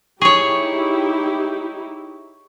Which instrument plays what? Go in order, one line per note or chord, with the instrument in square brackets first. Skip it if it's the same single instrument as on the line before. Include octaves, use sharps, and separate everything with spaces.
[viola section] D#4 E4 G4 [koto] G#4 C#5 [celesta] C#6